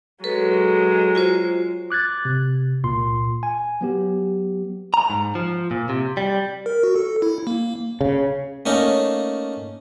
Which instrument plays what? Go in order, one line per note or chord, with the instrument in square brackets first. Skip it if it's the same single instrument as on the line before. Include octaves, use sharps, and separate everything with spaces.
[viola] F#3 G#3 [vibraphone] A4 B4
[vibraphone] F4 F#4 C5
[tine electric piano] D6 F#6 G#6 A6
C3
C#2 A#2 C6
G#5
F#3 B3 G4
[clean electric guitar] A#5
G#2
F3
A#2
C3
G3
[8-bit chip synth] A#4
F#4
A4
E4
A#3
[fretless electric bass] C#3
[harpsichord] A3 A#3 C#4 D#4